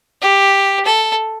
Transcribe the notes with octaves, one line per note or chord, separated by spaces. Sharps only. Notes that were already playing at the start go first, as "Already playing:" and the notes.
G4
A4